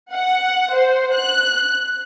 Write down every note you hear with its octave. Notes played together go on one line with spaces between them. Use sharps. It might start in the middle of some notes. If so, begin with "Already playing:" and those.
F#5
C5
F#6